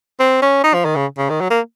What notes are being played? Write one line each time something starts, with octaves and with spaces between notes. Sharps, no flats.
C4
C#4
D#4
F3
D#3
C#3
C#3
D#3
F#3
A#3